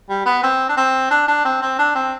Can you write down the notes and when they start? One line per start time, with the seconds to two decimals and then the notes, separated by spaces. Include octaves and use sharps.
0.09 G3
0.26 B3
0.43 C4
0.69 D4
0.77 C4
1.11 D4
1.28 D4
1.45 C4
1.62 C4
1.79 D4
1.95 C4